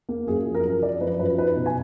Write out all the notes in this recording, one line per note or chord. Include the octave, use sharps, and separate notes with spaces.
A#3
F#2 G#4
F3
A#4
F#2
F3 D5
F3 B4
F#2 B4
D#4 B4
B2
G#5